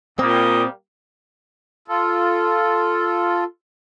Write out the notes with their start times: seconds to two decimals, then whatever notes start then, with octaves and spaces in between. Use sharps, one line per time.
0.19 A#2 G3 A#3 C4 D#6
1.88 F4 A4